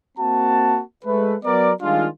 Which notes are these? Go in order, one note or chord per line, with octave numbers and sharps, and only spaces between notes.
A#3 C4 F#4 A5
G#3 A3 B4
F#3 B3 A#4 D5
D#3 G3 G#3 D4 F4